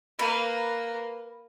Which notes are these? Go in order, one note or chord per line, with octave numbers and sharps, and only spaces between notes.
A#3 B4